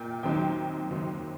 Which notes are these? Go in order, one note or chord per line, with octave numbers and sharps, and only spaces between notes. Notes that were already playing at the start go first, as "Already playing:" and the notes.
Already playing: A#2 G5
D#2 D#3 F#3 C4 D#4 G5
D#2 D#3 F#3 C4 D#4